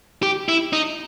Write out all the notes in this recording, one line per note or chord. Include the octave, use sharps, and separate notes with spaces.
G4
E4
D#4